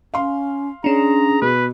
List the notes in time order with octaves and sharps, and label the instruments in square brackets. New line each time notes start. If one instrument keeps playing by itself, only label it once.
[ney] C#4 [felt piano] F5 C6
[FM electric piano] C#4 D4 [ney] G#4 [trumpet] A#5
[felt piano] B2 [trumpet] B4